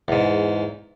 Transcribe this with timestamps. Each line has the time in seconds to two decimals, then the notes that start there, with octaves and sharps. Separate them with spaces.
0.08 E2 G#2